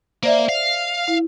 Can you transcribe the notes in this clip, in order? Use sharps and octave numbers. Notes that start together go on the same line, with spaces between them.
A#3 C5 D5 E5
F5
E4